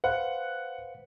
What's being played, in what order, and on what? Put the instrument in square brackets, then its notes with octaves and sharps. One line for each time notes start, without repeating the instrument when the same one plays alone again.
[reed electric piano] B4 C5 F5 [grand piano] F#5